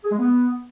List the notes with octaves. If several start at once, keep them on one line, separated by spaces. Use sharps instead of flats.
G#4
G#3
B3